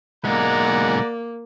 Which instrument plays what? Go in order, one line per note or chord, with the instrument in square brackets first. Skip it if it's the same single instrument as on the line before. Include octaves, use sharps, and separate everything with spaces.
[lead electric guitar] B1 G#3 [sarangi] A#3 [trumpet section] D5 F#5 A#5